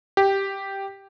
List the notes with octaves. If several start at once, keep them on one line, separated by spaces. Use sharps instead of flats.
G4